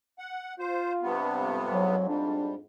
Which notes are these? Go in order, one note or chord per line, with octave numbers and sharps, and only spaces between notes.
F#5
F4 C5
G2 C3 B3
F2 G#2
F#3
G3 D4